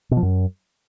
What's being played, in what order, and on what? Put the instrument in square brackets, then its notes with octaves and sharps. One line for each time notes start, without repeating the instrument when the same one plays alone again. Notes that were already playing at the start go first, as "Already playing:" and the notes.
[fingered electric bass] B2
F3
F#2